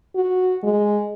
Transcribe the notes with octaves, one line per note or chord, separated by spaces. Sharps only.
F#4
G#3